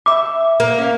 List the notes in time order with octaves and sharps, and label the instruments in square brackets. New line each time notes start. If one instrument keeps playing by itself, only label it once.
[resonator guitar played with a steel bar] G4 E5 [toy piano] D6
[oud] A#3
[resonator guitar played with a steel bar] C#4 F5